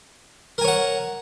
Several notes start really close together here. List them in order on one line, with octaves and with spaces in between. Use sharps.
A#4 G#5 C#5 F#5